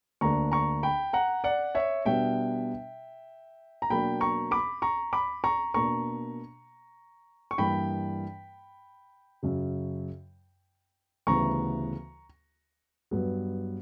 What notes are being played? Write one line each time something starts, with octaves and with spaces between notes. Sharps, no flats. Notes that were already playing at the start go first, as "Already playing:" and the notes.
D2 D3 A#3 D4 A#5 C#6
A#5 C#6
G5 B5
F#5 A#5
D5 F#5
C#5 E5
B2 G3 B3 D4 E5 G5
A#5
B2 F#3 A#3 D4 G5 B5
A#5 C#6
B5 D6
A#5 C#6
B5 D6
A#5 C#6
B2 A#3 D4 A#5 C#6
C#6
G2 E3 A#3 D4 G5 B5
F#2 C#3 F#3
D2 C#3 E3 G3 B3 A#5 C#6
G2 F#3 B3